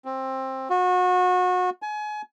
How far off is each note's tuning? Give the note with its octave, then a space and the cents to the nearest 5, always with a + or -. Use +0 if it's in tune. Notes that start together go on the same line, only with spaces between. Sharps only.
C4 +15
F#4 -30
G#5 +30